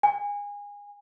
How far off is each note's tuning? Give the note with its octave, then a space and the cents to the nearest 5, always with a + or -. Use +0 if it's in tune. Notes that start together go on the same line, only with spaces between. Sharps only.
G#5 -25